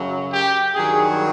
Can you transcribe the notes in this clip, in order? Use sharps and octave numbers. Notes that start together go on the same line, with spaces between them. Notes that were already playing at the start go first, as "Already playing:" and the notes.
Already playing: F#2 C#3 F#3
G4
G2 D#3 F#3 G#4